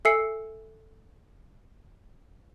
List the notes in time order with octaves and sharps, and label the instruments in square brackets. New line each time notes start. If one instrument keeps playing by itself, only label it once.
[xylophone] A4 E5 G#5 E6 C7 C#7